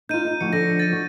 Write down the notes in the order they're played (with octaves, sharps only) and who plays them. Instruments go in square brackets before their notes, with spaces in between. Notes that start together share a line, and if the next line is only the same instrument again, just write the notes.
[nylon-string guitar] D#4 F4 [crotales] G6 D#7
[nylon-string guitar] D#4
[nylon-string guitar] D2 F#4 [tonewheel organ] F3 [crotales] C#7
[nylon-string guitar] D3 [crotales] A#6
[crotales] A6 D#7
[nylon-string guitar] F#4